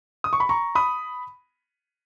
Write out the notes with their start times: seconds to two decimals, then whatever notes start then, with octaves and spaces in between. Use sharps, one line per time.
0.24 D#6
0.33 C#6
0.40 B5
0.49 A#5 C#6
0.75 B5 D#6